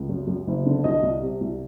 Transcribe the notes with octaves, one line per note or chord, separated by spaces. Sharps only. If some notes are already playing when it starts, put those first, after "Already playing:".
Already playing: C#2
F#2
F#2
F#1
D3
C2 D#5
C2
C3
C2